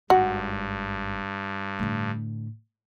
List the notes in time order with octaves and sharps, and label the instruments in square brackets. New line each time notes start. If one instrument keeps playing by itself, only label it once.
[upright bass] G#1 [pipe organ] G2 [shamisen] F#4
[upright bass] A2 D3